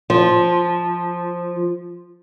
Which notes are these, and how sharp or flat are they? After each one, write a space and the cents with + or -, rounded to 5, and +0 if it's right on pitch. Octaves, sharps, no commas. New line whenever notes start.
F3 +5